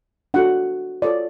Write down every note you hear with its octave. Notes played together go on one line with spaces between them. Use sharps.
D4 F#4 A4 F#5
F4 A4 C#5 D5